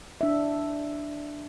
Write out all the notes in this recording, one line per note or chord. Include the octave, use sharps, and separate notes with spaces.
D4 E5